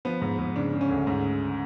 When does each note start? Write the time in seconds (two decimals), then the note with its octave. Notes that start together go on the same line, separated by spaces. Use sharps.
0.05 F3 B3
0.21 G#2
0.39 G#2
0.56 C#3 D4
0.73 C#3
0.81 C#4
0.89 D2
1.07 G#2